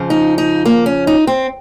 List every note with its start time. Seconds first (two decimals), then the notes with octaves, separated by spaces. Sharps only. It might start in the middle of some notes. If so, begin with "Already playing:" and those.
Already playing: F2 C#3 F3
0.10 D#4
0.38 D#4
0.65 A#3
0.86 C#4
1.07 D#4
1.27 C4